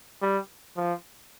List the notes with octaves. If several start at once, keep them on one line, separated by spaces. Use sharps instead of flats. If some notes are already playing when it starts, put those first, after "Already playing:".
G3
F3